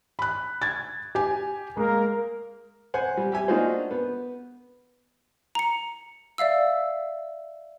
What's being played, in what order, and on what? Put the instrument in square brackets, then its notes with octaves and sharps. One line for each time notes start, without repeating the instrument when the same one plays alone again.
[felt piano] B5 F#6
G#6 A6
G4 G#5
[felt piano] G#3 [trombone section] A#3 A#4
[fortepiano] C5 F#5 G#5
G3
G4 E5 G#5
A#3 D4 D#4 F4 F#4 C5
B3
[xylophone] A#5 C#7
D5 E5 F5 E6